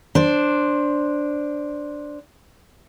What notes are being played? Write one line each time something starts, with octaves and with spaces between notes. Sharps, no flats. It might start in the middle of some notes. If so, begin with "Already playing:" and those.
D4 C5